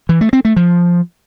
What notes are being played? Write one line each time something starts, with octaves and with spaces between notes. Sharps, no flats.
E3
A3
C4
A3
F3